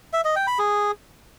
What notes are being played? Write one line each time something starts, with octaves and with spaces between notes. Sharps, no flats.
E5
D#5
G5
B5
G#4